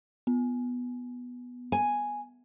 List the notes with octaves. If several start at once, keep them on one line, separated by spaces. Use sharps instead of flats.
B3
G#5